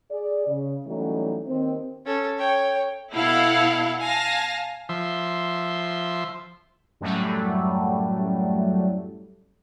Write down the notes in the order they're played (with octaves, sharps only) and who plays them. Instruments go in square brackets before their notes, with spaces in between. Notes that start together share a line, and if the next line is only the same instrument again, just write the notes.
[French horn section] G#4 D5
C#3
E3 F#3 G3 A3 C#4 D#4
D#2 C4
[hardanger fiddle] C#4 A4
C#5 G5
[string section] B2 E4 A4 F5 F#5
F5 G#5 A5 A#6
[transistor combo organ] F3 E5 C6
[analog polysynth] F#2 A2 F#3 G3 A3